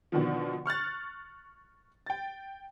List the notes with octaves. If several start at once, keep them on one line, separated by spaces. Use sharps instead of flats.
B2 D3 D#3 F3
C#6 F6 F#6 A6
G5 A6